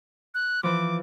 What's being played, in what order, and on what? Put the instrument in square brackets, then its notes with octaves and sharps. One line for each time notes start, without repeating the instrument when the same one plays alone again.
[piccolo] F#6
[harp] E3 F3 [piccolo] D6